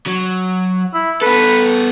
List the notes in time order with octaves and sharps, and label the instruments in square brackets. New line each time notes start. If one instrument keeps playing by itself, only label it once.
[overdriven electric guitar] F#3
[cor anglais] E4
[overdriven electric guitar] B3 A4 [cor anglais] B4